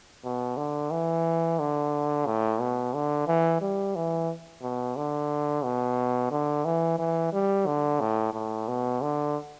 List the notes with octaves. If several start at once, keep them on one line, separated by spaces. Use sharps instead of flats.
B2
D3
E3
D3
A2
B2
D3
E3
G3
E3
B2
D3
B2
D3
E3
E3
G3
D3
A2
A2
B2
D3